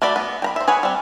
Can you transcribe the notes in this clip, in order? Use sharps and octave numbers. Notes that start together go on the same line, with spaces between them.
A3 F#4 D5 B5
B3
G5 A#5 B5
C5 E5
G#4 B4 C#5 F#5
G3 C4